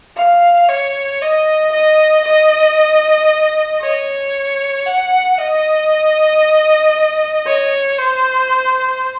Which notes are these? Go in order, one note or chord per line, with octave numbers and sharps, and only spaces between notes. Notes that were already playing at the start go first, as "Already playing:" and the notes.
F5
C#5
D#5
D#5
D#5
C#5
F#5
D#5
C#5
C5